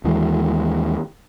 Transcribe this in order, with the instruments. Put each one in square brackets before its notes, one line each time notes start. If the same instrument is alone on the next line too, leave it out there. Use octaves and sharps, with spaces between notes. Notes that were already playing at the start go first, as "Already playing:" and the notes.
[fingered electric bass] D#2 E3 G#3